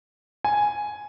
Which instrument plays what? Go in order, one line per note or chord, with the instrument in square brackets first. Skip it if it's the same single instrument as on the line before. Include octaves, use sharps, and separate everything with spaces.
[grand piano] G#5